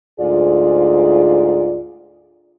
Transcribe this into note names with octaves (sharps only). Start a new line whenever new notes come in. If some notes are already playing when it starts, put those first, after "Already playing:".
D2 G#2 F4 G#4 D5